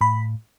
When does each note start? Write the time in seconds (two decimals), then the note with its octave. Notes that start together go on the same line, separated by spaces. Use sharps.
0.01 A2 B5